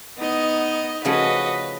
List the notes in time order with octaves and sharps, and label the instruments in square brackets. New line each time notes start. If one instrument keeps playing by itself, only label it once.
[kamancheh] B3 [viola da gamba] D#4 D#5
[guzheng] C#3 F3 A3 [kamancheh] F#4 D#5 [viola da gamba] B4